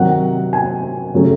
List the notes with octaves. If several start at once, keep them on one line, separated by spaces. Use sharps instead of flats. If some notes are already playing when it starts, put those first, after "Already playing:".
Already playing: C3 D#3 F#3 F#5
G#5
C#3 F#3 A3